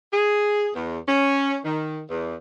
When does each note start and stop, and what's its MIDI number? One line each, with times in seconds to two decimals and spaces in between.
0.13 0.69 68
0.75 0.99 40
1.07 1.57 61
1.65 2.01 51
2.09 2.35 40